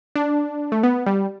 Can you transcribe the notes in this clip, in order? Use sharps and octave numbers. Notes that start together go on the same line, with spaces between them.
D4
A3
B3
G3